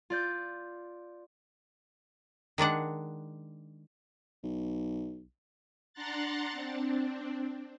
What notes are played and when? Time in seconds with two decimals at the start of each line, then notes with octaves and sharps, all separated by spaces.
0.10 F4 D5 G6
2.58 D#3 G#3 D4 F#5
4.43 B1
5.93 D4 F#5 A#5 C6 F#6 A6
6.52 C4 D4